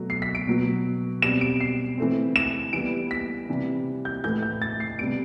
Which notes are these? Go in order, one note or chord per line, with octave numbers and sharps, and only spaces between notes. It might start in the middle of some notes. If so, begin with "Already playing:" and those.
Already playing: B2 F#3 A3
C7
B6
D7
B2 F#3 B3
B2 G3 C4 E7
D7
C7
E3 A3 C4
E7
E3 G3 B3 D7
B6
C3 E3 G3
G6
A2 E3 A3 G6
G6
A6
C7
C3 G3 B3 D7